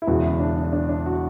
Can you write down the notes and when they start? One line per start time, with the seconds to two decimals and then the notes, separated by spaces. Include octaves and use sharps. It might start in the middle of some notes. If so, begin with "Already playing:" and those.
0.02 E4
0.07 E1 E2 C#3 E3 F#4
0.24 E4
0.40 D4
0.56 D4
0.73 D4
0.89 D4
1.06 F#4